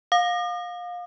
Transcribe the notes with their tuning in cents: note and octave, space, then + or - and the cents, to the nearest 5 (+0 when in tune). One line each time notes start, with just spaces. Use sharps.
F5 +25 D#6 -45